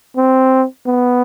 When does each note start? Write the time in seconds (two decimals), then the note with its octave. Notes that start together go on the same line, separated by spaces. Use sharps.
0.17 C4
0.86 B3